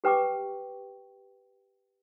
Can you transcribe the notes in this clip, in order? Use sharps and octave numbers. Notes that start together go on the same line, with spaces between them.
G4 B4 G5 C#6 D6